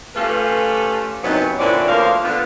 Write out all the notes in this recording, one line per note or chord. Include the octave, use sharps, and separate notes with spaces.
A3 C#4 F4 G4 A4 B4
F#2 C3 F#3 B3 D#4 E4
A#2 D3 C4 C#4 E4 D5
D2 F3 A#3 B3 A#4 F5
D3 B3 F4